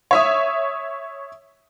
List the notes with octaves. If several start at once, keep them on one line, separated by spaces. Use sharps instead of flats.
C#5 E5 D#6